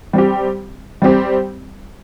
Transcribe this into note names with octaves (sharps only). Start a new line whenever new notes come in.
G3 C4 G4
G3 C4 G4